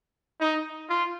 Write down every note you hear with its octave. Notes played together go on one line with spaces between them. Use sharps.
D#4
F4